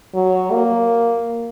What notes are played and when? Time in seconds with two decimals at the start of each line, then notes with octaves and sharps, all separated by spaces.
0.14 F#3
0.52 A#3